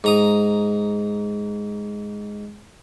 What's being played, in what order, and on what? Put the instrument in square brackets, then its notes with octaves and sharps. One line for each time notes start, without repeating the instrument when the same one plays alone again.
[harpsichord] G#2 A#5 D#6